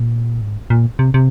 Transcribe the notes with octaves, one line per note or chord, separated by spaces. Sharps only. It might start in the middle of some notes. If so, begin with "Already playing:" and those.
Already playing: A#2
G#2
A#2
C3
C3